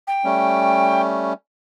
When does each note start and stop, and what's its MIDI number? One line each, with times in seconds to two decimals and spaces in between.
0.07 1.01 79
0.24 1.33 55
0.24 1.33 57
0.24 1.33 61